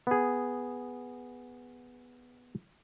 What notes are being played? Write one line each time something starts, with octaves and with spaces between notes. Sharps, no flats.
B3 G#4